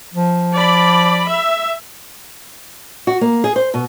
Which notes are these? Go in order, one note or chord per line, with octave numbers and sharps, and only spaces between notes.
F3
D5 B5
E5
F#4
A#3
G#4
C5
B2